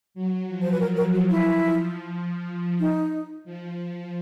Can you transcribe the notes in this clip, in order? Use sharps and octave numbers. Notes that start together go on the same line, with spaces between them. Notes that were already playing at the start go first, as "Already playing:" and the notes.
F#3
F3
C5
B4
A#4
A#4
F#4
E4
F3
D#4
F3